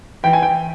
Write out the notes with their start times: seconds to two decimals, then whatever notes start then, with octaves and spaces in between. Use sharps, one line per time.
0.23 E3 G5
0.33 G#5
0.42 G5